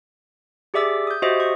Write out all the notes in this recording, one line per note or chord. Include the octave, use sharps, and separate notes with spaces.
G4 G#4 D5 E5 D6 E6
D#6 G6
F#4 G4 C5 D#5 E5 D#6
C#6